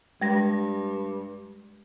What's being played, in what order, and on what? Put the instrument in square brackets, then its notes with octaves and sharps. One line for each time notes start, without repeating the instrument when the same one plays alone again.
[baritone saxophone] G2 [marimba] G#3 A#6